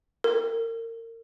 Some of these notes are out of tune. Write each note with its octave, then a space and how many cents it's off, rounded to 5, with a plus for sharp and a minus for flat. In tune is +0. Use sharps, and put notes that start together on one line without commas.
A#4 -30